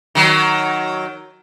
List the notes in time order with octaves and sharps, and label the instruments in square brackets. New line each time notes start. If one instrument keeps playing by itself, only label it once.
[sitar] D#3 F#3